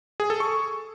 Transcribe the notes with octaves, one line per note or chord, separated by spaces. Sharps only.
G#4
A4
C#6